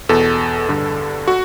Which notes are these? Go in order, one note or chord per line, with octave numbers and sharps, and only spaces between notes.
E2 B2 A4
G2 D3
F#4